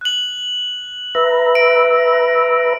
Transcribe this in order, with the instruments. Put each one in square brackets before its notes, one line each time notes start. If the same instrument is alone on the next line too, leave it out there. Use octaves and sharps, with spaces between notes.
[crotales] F#6 F#7
[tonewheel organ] B4 E5 A#5
[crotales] D7